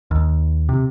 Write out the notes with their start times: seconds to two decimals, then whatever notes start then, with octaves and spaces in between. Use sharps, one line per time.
0.11 D#2
0.69 C3